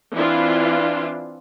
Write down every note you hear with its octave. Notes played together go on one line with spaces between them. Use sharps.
E3 C4 D4 E4 F4